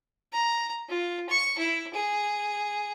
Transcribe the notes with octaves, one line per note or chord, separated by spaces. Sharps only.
A#5
F4
C#6
E4
G#4